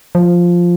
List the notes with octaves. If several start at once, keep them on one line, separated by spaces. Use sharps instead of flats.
F3